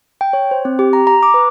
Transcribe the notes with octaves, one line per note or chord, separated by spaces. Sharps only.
G5
C#5
C5
C4
G4
A#5
A#5
D6
B4